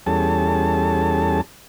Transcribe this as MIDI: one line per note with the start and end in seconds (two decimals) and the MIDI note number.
0.06 1.41 40
0.06 1.41 55
0.06 1.41 61
0.06 1.41 68
0.06 1.41 69
0.06 1.41 81